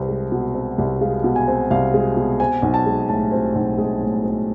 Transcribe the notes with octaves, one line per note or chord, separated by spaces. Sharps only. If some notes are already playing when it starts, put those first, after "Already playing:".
Already playing: C2 C4 B4
G#3
B2
C4
C2
G#3 F5
B2
G#5
C4
C2 F5
G#3
B2
C4 G#5
B1
A5
G#3
A2 A5
C4
B1
G#3
A2
C4